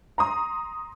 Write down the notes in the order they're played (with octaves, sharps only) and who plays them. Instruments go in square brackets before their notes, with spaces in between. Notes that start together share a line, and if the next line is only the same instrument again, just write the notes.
[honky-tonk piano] A#5 C6 D#6